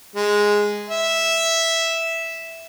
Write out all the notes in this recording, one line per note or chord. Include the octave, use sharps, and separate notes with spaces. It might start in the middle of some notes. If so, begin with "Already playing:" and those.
G#3
E5